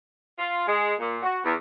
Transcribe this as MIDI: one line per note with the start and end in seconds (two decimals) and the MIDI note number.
0.38 0.63 65
0.68 0.94 56
1.00 1.18 46
1.23 1.38 66
1.44 1.54 40